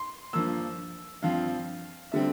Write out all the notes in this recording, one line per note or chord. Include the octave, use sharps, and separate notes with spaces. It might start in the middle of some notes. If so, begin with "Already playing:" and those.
Already playing: C6
G2 F3 A#3 E6
G2 F3 C4 F5
D3 G3 C4 E5